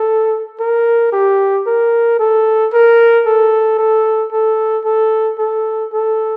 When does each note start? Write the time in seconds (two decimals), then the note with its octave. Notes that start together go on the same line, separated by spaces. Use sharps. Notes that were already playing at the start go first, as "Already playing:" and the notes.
Already playing: A4
0.60 A#4
1.13 G4
1.67 A#4
2.19 A4
2.73 A#4
3.26 A4
3.79 A4
4.32 A4
4.85 A4
5.39 A4
5.93 A4